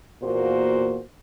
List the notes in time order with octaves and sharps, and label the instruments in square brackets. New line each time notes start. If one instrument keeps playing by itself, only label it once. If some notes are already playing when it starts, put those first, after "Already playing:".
[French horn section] E2 A#2 A#3 F#4 C5